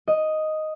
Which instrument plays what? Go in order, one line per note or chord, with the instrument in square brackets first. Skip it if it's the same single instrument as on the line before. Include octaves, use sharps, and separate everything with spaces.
[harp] D#5